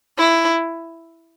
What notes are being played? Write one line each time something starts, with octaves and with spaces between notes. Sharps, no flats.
E4